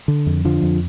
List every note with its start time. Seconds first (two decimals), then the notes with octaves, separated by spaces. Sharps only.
0.08 D3
0.27 F2
0.45 D3 F3
0.63 F2